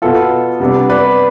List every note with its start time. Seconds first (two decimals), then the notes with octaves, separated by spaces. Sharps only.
0.02 B2 B3 F4 A4
0.60 C3 G3 B3 D4
0.89 B4 D5